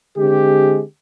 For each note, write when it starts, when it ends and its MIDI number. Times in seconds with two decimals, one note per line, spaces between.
0.18 0.83 50
0.18 0.83 56
0.18 0.83 60
0.18 0.83 67